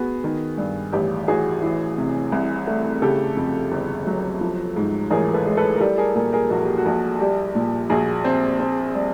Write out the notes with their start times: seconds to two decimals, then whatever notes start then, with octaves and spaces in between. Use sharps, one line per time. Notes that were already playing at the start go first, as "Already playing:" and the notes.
Already playing: B3 F#4 G#4
0.24 D#3
0.58 G2
0.92 A1 G4
1.28 A1 F#4 G#4
1.62 E3
1.98 C3
2.32 C2
2.67 A3
3.02 C#3 G4 A4
3.37 F2
3.72 G1
4.07 F#3
4.41 F3
4.76 G#2
5.11 A1 G#4 A#4
5.34 A4 B4
5.47 G#3
5.57 A4 B4
5.76 A#4
5.81 G3 G4 A4
5.98 G#4 A#4
6.15 A#2 G#4 A#4
6.33 G#4 A#4
6.50 A#1 F#4
6.65 G4
6.77 F#4
6.86 A#1
7.20 G3 G4
7.55 A#2
7.90 A#1 F#4 G#4
8.25 C4
8.60 C4
8.94 G3